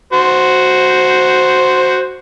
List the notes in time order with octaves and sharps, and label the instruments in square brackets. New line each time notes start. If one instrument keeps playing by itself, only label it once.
[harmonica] F#4 C5